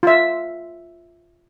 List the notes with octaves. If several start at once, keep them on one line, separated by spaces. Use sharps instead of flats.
F4 E5